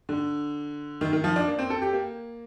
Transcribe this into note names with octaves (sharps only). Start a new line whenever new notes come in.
D3
D#3
D#3
F3
D4
A#3
C4
A4
G4
A#3